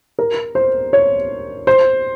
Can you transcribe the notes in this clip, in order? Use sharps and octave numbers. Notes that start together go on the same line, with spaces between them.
A#4
C5
C#5
C5